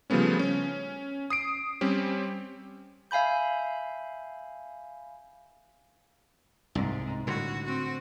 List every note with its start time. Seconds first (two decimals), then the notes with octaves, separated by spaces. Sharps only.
0.10 C#3 F3 G3 A3 B3 C#4
0.39 C#4
1.30 D#6 C7 D7
1.81 G3 C4 C#4 G4
3.11 E5 F5 G#5 B5 G6
6.75 C2 G#2
7.27 A2 D3 F#4
7.65 C4 F#4